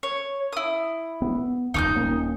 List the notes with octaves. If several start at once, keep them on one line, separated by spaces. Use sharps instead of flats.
C#5
E4 D#6
B3
F1 D#2 D#4 D6 G6
D#1 A#3 C#4